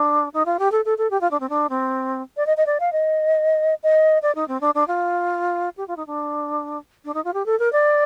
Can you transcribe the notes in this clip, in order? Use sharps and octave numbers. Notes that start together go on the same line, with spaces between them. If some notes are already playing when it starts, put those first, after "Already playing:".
Already playing: D4
D#4
F4
G4
A4
A4
A4
G4
F4
D4
C4
D4
C4
D5
D#5
D#5
D5
F5
D#5
D#5
D5
D#4
C4
D4
D4
F4
G4
F4
D#4
D4
D4
D#4
F4
G4
A4
A#4
D5